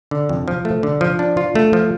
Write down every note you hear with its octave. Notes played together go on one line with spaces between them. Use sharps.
D3
F2
F3
A3
D3
F3
D4
F4
A3
F3